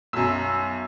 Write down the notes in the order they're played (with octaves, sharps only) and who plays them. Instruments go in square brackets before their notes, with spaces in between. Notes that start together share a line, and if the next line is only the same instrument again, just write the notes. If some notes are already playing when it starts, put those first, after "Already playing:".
[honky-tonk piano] B1 F#2 [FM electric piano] E6